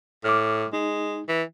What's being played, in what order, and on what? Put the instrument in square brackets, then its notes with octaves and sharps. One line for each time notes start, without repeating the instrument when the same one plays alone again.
[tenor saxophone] A2 [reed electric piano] D6 F6
[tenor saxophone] G#3 [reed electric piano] D#4
[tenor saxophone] E3